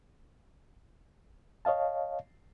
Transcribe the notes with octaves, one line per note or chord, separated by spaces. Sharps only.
C#5 D#5 F5 A5